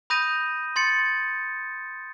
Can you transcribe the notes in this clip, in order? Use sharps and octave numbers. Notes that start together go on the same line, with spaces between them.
B5 D#6 G6 A#6 D#7
C6 A6 C#7